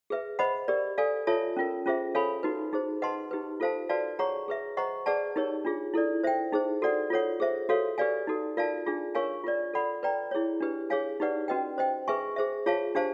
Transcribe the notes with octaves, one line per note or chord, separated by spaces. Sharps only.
G#4 B4 E5
C5 D#5 F#5 B5
G4 A#4 D5
A4 D5 F5 G#5
F4 A4 C#5 E5 A5
C#4 F4 A#4
C#4 F4 G#4 C5 E5
A4 C#5 F5 G#5 B5
D#4 F#4 B4
D#4 G#4 C5
B4 D#5 F#5 A5 C6
D#4 G4 B4
F4 A4 C5 F5 A5
F#4 B4 D5 F5 A5
G#4 C#5 F#5 A#5 C#6
G#4 B4 E5
C5 D#5 F#5 A#5 C#6
G#4 B4 D5 F#5 A5
D#4 G4 A#4 C#5
D4 F4 G#4
E4 A4 D5
C5 E5 G5
D#4 G#4 C5
F#4 A4 D5 F#5
F4 A4 C#5 F#5
G#4 C5 E5
F#4 A4 C#5 F5
G4 B4 D5 F5 G#5
D#4 F#4 A4
F4 A#4 D5 F5 A5
D4 F4 G#4
A#4 C#5 F5 G#5 C#6
F4 A#4 D5
A4 D5 F#5 B5
B4 D5 G5 A#5
E4 G#4 C#5
D4 G4 B4
G#4 C#5 F5 G#5
D#4 G4 B4 D5 F#5
C#4 F#4 B4 D#5 G5
C5 D#5 G5
G#4 B4 E5 G#5 C#6
G#4 C5 E5
F4 G#4 C#5 F5 A5
D4 G4 C5 F5 A5